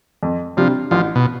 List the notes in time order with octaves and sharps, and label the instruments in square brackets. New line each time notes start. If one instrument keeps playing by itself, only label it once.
[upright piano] F2
[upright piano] C3 G3 D4 [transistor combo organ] F3
[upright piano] A1 [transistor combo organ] F3
[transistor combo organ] B2